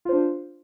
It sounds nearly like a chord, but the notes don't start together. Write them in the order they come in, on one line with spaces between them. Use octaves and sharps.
F4 C5 D4